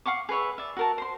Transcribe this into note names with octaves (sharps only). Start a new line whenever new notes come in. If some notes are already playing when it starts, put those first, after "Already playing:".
F5 F#5 C#6 D6
G#4 B4 C#5 E5
D5 E5
F#4 A#4 A5
C5 C6